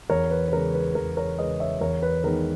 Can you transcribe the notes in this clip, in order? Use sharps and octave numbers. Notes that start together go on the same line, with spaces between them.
E2 A#4 C#5
B4
B4
C#3 G#3 A#4
B4
E2 A#4
A#4 C#5
C#3 G#3 B4 D#5
C#5 E5
E2 A#4 C#5
B4
D#3 G#3 B3 D#4 A#4